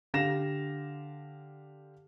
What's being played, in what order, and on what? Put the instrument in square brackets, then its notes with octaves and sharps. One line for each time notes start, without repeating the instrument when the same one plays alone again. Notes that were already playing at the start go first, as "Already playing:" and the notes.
[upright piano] D3 G4 F5 A#6 E7